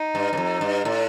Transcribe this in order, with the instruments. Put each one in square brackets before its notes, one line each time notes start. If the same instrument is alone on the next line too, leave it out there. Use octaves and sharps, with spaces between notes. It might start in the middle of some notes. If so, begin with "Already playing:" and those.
Already playing: [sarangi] D#4
[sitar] G2
G2
F2
G2
A2